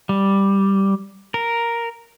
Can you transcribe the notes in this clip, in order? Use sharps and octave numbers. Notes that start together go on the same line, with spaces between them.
G3
A#4